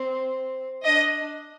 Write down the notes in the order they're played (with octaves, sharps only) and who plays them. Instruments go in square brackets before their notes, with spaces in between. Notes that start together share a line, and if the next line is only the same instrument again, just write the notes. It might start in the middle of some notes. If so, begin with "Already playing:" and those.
Already playing: [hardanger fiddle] C4
[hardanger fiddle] D4 [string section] D#5